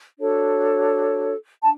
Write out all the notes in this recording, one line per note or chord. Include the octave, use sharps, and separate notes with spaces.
D4 F#4 A4 C#5
D4 A5